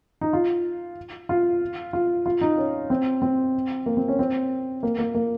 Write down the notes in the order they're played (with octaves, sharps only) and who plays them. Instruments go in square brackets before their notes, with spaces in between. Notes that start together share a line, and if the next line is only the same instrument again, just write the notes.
[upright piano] D#4
F4
F4
F4
F4
D#4
C#4
C4
C4
A#3
C4
C#4
C4
A#3
A#3
A#3